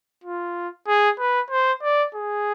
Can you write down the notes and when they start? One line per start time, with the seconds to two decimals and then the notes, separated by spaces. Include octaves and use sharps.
0.24 F4
0.88 G#4
1.19 B4
1.50 C5
1.83 D5
2.15 G#4